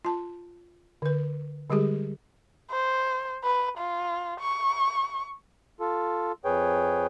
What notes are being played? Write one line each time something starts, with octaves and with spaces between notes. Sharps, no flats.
F4 A5
D3 B4
D3 G3 G#3 G4 G#4
C5
B4
F4
C#6
F4 A4
F2 G#4 B4 C#5 G5